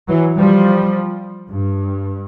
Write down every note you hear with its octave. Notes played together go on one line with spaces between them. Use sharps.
E3 F#3
F3 G3
G2